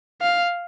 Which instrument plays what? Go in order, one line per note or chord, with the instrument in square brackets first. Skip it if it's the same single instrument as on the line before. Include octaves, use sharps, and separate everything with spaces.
[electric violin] F5